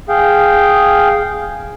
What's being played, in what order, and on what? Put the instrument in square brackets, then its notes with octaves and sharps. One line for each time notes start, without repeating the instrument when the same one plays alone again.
[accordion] G#4 F5 G5